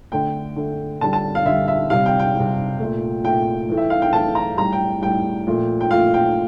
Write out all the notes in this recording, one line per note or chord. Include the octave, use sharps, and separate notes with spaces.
D3 A3 G5
D3 A3
D3 G3 A5
A5
F5
D3 G3 E5
E5
C3 G3 F5
G5
G5
C3 G3
A#2 A3
A#2 A3 G5
A2 E3 A3
E5
F5
G5
A2 E3 A3 A5
A#5
A2 G3 A#5
G5
A2 G3 G5
A#2 F3 A3
G5
A#2 F3 A3 F5
G5